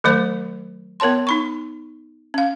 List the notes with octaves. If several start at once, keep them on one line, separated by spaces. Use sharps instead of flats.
D#3 F#3 A3 C5
B3 A#4 C#5 A5 C6
D#4 B5 C#6
C#4 F5